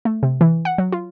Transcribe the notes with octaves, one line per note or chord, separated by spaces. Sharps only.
A3
C3
E3
F#5
F#3
F4